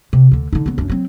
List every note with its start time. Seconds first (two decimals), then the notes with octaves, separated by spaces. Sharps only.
0.13 C3
0.32 D2 D3
0.53 D3 D#4
0.66 C#2 B3
0.78 F#2 D4
0.90 F#3 C4